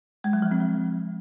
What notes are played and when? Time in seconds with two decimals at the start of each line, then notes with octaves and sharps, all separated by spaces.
0.24 G#3
0.33 F#3
0.42 F3
0.51 C4
0.60 F#3